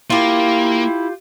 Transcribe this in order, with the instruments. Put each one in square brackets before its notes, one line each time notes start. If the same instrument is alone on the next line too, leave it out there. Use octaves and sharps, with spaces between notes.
[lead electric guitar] A#3 [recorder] E4 [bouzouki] F4 G4